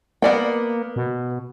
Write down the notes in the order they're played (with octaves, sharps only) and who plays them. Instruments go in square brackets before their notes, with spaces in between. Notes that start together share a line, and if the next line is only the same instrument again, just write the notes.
[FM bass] A#3 [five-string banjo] B3 D5 G5
[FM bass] B2